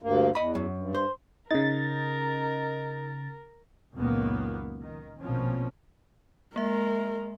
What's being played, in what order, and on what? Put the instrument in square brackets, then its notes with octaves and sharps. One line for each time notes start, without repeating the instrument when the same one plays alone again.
[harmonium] D2 G2 A#3
[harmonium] E2 [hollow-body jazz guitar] D#5 B5
[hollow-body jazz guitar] F#2
[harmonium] G2
[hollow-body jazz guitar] C5
[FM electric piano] C#3 A6 [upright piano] D#4 [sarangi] A#4
[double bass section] C#2 F#2 A#2 D#3 A#3 B3
D#3
A#1 B2 F3 C4 C#4
[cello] G#3 [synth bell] A#3 E5 [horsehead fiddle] A#4